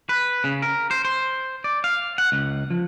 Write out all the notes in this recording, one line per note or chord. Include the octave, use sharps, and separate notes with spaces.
B4
C#3
A#4
C5
C5
D5
F5
F#5
C#2
F3